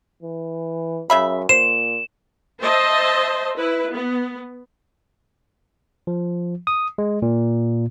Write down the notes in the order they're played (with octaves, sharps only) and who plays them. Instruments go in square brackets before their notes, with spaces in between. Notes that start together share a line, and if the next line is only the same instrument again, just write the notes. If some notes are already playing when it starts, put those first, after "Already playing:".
[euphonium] E3
[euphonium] F#2 [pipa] C#3 E5 B5
[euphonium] A#2 [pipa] C5 [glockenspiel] E7
[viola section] C5 D#5 E5 A5 C6
E4 B4
B3
[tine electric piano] F3
D#6
G#3
A#2